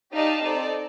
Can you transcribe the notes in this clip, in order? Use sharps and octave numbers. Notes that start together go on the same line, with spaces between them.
D#4 G4 D5 F5 A5
C4 D#4 A4 D5